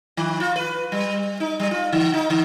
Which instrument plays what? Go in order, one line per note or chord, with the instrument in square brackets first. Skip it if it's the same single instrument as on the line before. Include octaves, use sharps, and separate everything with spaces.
[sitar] D#3
F4
B4
G3
D#4
G3
F4
D3
D#4
D3